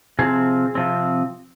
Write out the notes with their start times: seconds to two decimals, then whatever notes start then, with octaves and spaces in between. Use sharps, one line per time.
0.19 C3 F3 C4 G#4
0.75 C3 F3 C4